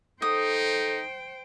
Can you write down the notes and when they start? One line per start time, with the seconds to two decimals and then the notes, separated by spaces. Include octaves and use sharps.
0.22 D#4 A4 C5 G5 D#6